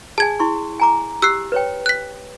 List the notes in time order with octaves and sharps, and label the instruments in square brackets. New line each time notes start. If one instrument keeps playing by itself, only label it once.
[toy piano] G#4 G#5 [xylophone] A5 G#6
[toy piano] E4 C6 C#6
G#5 A#5 D6
[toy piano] G4 [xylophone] E6 F#6 C7
[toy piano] B4 C#5 G5
[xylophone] F#6 B6